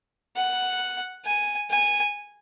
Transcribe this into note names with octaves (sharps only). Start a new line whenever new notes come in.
F#5
G#5
G#5